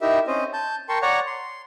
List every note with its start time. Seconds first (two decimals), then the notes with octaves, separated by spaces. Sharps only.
0.01 D#4 E4 G4 A#4 E5
0.27 C4 C#4 C5 D#5
0.53 A5 G6
0.89 A#4 G5 A5 C6 C#6
1.02 C#5 D5 F#5 A#5 C#6
1.27 C6